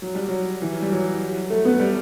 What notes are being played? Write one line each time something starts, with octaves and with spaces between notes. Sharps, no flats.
F#3
G3
F#3
E3
G3
F#3
A3
B3
G3